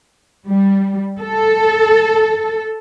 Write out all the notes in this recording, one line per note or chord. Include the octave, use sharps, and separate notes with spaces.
G3
A4